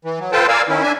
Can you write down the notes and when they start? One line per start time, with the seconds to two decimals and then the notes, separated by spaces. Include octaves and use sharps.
0.05 E3
0.20 F#3
0.32 F4 A4 B4 C5 G5 A5
0.48 A#4 D5 F5 G#5 E6
0.69 D#3 C#4 E4
0.83 D4 E5 G#5